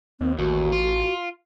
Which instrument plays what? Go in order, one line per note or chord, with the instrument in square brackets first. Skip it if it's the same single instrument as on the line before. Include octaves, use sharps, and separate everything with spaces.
[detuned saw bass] D#2 [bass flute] C4
[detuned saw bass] A1 [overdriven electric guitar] D#2 [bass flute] F#4
[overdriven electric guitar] F4